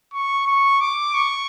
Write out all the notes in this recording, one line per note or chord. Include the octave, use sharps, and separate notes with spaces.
C#6
C#6
D6
C#6